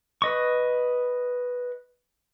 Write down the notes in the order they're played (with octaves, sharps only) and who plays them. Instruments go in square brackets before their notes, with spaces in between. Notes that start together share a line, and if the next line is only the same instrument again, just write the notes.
[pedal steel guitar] B4 D#5 C#6